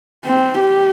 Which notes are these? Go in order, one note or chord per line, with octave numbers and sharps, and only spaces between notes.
C4
G4